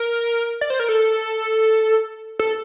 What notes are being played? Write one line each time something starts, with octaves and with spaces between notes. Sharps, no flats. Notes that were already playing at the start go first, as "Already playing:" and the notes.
Already playing: A#4
D5
C5
A#4
A4
A4